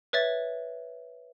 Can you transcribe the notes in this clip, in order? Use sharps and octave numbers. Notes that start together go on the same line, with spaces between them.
B4 C#5 E5 A6